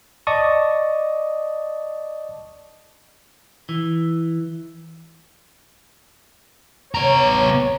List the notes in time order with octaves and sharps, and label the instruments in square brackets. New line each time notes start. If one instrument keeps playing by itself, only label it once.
[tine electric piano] D5 D#5 A5 C#6 D#6
[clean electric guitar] E3
[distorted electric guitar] B3 A#5 [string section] C#5